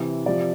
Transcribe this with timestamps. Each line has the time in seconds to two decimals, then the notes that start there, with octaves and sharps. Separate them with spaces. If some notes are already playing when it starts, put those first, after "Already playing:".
Already playing: C3 E3
0.26 C3 F3 D5